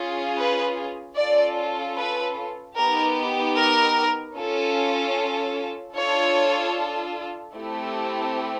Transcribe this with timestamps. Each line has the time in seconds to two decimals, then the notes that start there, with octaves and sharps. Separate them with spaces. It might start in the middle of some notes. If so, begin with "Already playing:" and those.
Already playing: C#4 F4 G#4
0.38 B4
1.17 C#4 F4 A4 D5
1.97 B4
2.77 B3 D#4 G4 A#4
3.57 A#4
4.36 C#4 F4 A4
5.96 D4 F4 A4 C#5
7.55 A3 C4 E4 G4